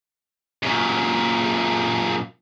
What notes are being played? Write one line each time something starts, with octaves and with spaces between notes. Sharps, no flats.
F#2 A#2